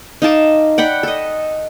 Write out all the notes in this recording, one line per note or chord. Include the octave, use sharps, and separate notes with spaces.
D#4 F5 A5 D6
D5 F#5 G5 B5
A4 D#5